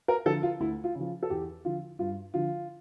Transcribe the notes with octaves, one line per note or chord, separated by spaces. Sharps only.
A#4
D3 F3 A4
F4
D2 E4
F4
C#3 F3
A4
E2 G4
D3 F3 F4
G2 F4
D3 F3 F4